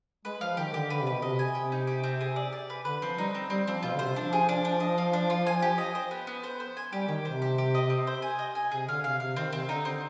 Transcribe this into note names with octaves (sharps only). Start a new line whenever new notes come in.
G#3 B4
F3 F5
D#3 G4
D3 G4
D3 B4
C3
B4
B2
C3 D#5
G#5
C3 G4
D#4
G4
C4
G#4
D5
D5
B4
D3 B4
F3 C4
G3 D#4
C4
G3 C4
F3 C4
B2 F4
D3
C3 C5
F3 D4
G#4
D4
D4
D#5
F4
D4
F4
G#5
G4
D#5
C5
B3
B3
C5
C5
G#5
G3 G4
D#3 G4
C3 C5
G4
G4
D#5
C4
C5
G#5
D#5
G#5
C3 G#4
D3 F5
C3 F5
C3 F5
D#3 C4
C3 C4
D3 D#4
D3 C4